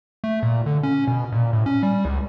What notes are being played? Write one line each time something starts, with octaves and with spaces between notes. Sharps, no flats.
A3
A#2
D3
C#4
B2
A#2
A2
C#4
G3
C#2